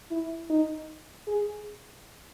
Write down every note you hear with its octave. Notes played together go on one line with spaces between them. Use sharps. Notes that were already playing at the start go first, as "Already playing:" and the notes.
E4
D#4
G#4